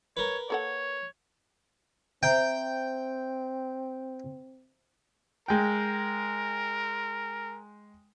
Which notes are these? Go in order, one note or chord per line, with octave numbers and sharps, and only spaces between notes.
A#4 B4 C#5
A#3 A4 C#5 F#5
C4 C5 E5 G5 A#5
G#3 A#4 G5